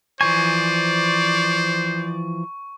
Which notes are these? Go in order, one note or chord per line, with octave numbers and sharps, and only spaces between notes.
E3 F3 C5 D5 G#5 C#6